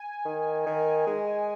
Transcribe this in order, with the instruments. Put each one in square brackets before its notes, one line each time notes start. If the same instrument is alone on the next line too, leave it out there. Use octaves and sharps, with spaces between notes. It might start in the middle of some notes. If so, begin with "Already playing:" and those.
Already playing: [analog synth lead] G#5
[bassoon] D#3
D#3
G#3